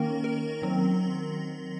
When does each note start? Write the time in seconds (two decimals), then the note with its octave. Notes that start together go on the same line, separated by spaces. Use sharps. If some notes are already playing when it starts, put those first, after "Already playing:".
Already playing: D#3 A#3 C#4 A#4
0.24 A#4
0.62 D#3 F#3 C4